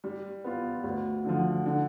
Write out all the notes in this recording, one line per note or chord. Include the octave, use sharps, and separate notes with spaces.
G3
B3 F4
D2
D3 F3
D3